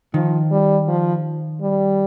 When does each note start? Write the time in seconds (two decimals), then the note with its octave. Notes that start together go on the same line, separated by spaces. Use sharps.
0.14 D#3 F3
0.51 G3
0.88 F3
1.61 G3